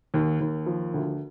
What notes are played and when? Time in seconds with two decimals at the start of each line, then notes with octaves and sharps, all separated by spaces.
0.14 D#2
0.40 D#2
0.66 F3
0.94 D2